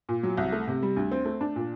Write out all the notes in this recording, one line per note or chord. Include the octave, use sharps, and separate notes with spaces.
A#2
F#3
C2
A3
C3
G3
D2
C4
A3
D4
A#2